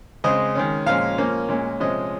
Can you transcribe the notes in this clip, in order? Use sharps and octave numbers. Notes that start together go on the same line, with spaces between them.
C#3 G#3 C4 D#5
D#3 G#3 C#4
A#2 F3 G#3 C#4 F5
F3 A#3 C#4
A#2 G#3 C#4
C3 F3 G#3 C#4 D#5